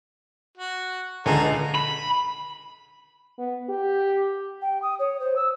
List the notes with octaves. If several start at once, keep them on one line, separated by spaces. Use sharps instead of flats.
F#4
C#2 D3 A4 G#5 A#5
B5
B3
G4
G5
D#6
C#5
C5
E6